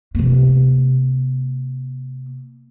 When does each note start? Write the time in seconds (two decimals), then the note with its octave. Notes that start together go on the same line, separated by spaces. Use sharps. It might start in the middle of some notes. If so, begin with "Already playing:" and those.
0.15 C3 A#3